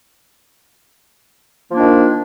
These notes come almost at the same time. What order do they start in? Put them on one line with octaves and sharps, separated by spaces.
F3 A#3 D4 D#3